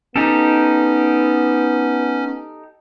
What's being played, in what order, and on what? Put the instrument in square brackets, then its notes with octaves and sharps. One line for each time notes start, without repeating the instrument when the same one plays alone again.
[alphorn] B3 [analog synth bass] C#4 [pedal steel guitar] D#4 G4 A4